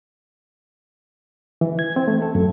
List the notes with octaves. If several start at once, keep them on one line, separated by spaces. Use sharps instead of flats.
E3
G#6
C4
A3
A4
F#2